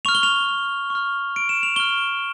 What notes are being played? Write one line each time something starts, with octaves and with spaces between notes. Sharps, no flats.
C#6 F6 F7
G7
F7
C#6 F6
D7
E7
F7
C#6 F6 G7